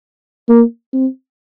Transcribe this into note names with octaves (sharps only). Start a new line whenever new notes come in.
A#3
C4